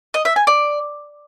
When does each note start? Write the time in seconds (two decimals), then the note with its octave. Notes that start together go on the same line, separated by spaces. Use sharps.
0.14 D#5
0.25 E5
0.36 G#5
0.47 D5